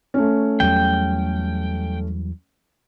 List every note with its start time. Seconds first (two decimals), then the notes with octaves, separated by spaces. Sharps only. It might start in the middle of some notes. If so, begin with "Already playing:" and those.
0.14 A3 C#4
0.60 E2 F#3 G3 G5